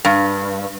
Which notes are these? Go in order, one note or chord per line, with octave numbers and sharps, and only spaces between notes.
G2